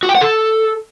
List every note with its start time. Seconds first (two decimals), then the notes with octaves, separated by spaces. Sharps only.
0.03 F#4
0.09 G5
0.15 F#5
0.21 A4